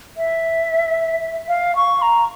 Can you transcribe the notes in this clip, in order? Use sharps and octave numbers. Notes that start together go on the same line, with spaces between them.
E5
F5
C#6
A#5